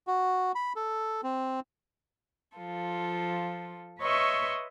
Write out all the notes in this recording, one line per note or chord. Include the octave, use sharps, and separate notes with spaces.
F#4
B5
A4
C4
F3 F4 A4
B4 C#5 D#5 E5 C6 C#6